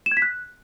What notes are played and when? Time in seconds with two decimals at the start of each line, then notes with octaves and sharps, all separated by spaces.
0.06 E7
0.11 G#6
0.17 B6
0.22 F#6